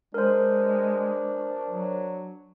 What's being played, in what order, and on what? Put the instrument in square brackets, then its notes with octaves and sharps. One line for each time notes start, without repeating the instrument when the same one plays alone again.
[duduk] G#3 [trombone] D4 [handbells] A#4 C5
[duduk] F#3